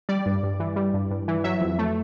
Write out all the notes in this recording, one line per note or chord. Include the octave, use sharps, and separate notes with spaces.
G3 D5
G2
G2
E3
G3
G2
G2
E3
F#3 E5
F2
A3